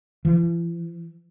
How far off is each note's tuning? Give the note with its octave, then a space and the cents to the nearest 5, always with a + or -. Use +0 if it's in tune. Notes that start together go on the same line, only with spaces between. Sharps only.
E3 +45